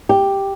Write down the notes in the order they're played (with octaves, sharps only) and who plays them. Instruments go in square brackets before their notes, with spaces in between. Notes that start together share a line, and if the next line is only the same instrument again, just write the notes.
[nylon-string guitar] G4